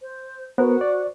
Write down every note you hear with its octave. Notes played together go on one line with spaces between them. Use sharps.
C5
B3 F#4 A#4 C5
D5